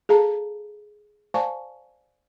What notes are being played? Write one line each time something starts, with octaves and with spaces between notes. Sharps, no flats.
G#4 A4 F5 A5 A#5
C5 D5 F5 G#5 A5 C#6